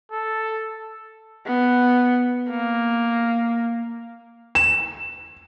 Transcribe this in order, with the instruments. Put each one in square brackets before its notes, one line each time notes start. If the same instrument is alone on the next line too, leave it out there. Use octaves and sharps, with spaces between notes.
[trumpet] A4
[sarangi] B3
A#3
[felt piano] E7